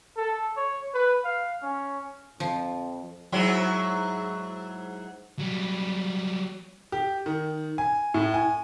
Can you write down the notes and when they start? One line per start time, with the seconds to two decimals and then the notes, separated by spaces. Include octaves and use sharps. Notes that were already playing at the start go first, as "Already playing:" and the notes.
0.17 A4
0.56 C#5
0.94 B4
1.24 F5
1.62 C#4
2.40 F2 F3
3.32 G#2 F#3 E4
5.39 F#3 G3
6.92 G4
7.26 D#3
7.78 G#5
8.14 A2
8.34 G#5